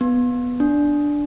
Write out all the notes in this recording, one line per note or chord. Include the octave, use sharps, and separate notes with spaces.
B3
D4